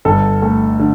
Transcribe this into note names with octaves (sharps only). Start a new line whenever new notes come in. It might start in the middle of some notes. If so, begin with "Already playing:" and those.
G1 A4
A3
D3